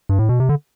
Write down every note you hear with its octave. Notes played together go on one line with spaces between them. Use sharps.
G2
A2
B2
C3
D3